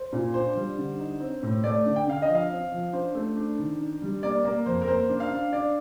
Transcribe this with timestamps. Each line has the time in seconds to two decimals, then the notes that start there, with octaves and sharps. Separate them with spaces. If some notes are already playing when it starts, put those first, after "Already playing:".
Already playing: C5
0.13 A#2
0.34 D4 C5
0.55 G3
0.78 D3
0.99 D#4
1.20 C4
1.43 A2
1.64 A3 D5
1.85 D3
1.96 G5
2.07 D3 F5
2.22 D#5
2.29 F3
2.35 F5
2.51 C4
2.72 F3
2.93 D4 C5
3.15 A3
3.37 D4
3.58 D#3
3.79 D4
4.02 G3
4.23 A#3 D5
4.45 A#3
4.66 F2 C5
4.82 A#4
4.88 A#3 C5
5.09 D4
5.20 F5
5.31 D4
5.52 D4 D5